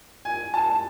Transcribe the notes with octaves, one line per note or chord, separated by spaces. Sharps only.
G#5
A5